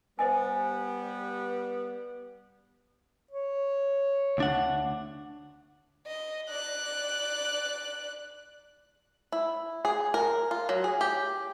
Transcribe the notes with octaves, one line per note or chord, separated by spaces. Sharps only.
G3 B3 C5 D#5 G#5
C#5
D2 D4 F#5
D#5
D5 F#6
E4
G#4
A#4
F4
F#3
G#4
G4